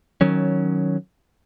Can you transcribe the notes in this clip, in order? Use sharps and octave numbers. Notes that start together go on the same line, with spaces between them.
D#3 F#3 C#4